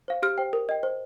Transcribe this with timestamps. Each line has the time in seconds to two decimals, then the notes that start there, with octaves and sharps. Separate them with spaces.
0.08 C5 F5
0.23 G4 F6
0.38 C5 G5
0.53 A#4
0.69 D#5 G5
0.83 C5